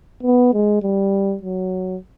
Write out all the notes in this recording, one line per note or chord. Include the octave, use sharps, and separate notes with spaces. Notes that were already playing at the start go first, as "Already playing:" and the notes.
B3
G#3
G3
F#3